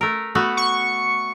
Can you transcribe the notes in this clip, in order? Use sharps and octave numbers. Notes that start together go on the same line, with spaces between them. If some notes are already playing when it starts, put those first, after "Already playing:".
A3 A#4
A3 B3 F#4
C#6